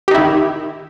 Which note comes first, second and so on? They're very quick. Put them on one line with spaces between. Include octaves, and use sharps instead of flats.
G4 D#4 E4 D#3